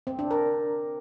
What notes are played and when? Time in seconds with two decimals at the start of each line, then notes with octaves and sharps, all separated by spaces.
0.07 C4
0.19 D4
0.31 A#4